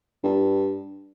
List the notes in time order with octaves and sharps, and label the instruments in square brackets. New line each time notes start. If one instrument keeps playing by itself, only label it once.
[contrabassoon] G2